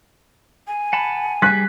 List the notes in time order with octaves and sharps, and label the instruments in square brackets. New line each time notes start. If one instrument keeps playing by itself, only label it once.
[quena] G#5
[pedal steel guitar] F#5 A5 B5
[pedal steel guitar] G3 G#4 [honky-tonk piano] F#6 B6